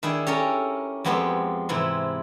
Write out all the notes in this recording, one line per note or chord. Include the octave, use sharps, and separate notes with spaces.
D#3 D4 E4 G#4
C#4 G4 A4 A#4
F2 G#3 B3 C4 G4
G#2 C3 E3 E4